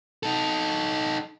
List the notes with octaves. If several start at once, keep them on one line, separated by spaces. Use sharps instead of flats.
D#4 A4